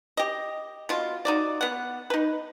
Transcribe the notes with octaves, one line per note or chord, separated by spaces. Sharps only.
G4 D#5
B2 F4
D#4 F#4 D5
B3 F#5
D#4 B4